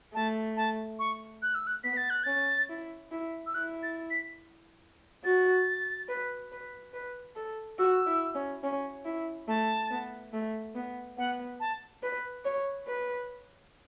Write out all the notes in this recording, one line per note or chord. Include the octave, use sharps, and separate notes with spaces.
A3 A5
A5
C#6
F#6
E6
F#6
B3 B6
A6
F#6
C#4 A6
E4
E4
E6
E4 F#6
A6
B6
F#4 A6
B4
B4
B4
A4
F#4 E6
E4
C#4
C#4
E4
A3 A5
B3
A3
B3
B3 F#5
A5
B4
C#5
B4